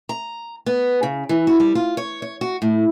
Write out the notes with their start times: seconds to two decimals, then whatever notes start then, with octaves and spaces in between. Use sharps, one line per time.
0.09 A#5
0.66 B3
1.03 C#3
1.29 E3
1.47 F#4
1.60 G3
1.75 F4
1.97 C#5
2.22 C#5
2.41 F#4
2.62 A2